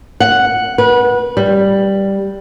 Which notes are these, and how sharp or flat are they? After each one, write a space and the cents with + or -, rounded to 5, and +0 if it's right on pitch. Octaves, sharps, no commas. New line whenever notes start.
F#5 +0
B4 -25
G3 +0